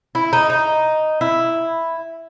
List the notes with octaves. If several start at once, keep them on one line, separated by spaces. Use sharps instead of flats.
E4
D#4
D#4
E4